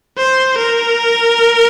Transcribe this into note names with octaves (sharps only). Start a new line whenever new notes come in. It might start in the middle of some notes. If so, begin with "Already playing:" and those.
C5
A#4